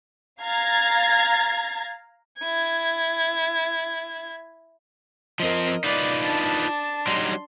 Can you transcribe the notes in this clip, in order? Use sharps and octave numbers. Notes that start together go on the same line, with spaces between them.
F5 A#5 G#6 A6
E4 G#6
F3 C4 A#4 D#5
D#4 F4 B4 D5
D4 A5
F#3 G3 D#4 C6